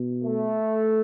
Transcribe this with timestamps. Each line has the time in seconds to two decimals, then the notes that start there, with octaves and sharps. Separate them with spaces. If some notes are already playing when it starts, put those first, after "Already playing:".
Already playing: B2
0.23 A3